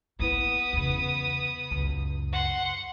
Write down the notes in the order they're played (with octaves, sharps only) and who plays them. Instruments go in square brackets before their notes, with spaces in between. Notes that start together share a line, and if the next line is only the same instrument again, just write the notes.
[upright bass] A#3 E4 [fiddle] B3 D#6
[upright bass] E2 C#3
C#2 F#2
[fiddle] F#5 C6